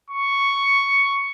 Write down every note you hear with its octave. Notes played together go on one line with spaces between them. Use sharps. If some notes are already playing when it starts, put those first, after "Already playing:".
C#6